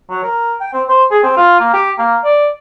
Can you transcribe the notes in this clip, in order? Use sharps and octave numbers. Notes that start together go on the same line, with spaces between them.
F#3
A#4
G5
C4
C5
G#4
C4
F4
A#3
G4
A#3
D5